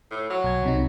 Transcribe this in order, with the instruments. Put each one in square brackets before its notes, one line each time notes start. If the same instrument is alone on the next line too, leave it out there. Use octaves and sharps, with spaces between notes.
[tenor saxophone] A2
F#3
[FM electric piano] B1 G#6
C2 C3 D#4